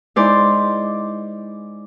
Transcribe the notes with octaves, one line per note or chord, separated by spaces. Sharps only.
G#3 D#4 E4 C5 D5